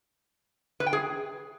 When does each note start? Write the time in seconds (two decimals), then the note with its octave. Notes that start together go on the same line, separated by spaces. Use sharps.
0.80 B4
0.86 G5
0.93 G#4